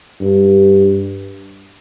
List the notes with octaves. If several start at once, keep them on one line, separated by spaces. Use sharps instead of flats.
G2